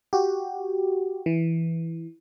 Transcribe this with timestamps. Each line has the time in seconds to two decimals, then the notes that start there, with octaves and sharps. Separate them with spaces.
0.13 F#4 G4
1.26 E3